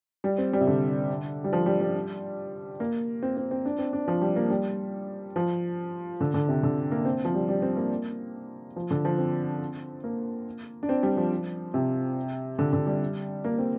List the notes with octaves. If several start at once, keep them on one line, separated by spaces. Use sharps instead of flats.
G3
C4
G3
C3
D3
G3
F3
G3
G3
A#3
C4
C4
C4
D4
C4
D4
F3
G3
A#3
G3
F3
D3
D3
C3
D3
A#3
C4
F3
G3
G3
C4
A#3
F3
D3
F3
C4
A#3
D4
C4
G3
F3
C3
D3
D3
G3
A#3
C4